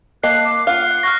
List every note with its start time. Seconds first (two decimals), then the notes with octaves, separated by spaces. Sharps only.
0.23 A#3 D#5 A5 F#6 C7
0.45 D6
0.67 F4 F5 F#5 F6 C7
1.03 C#6 F6 F#6 A#6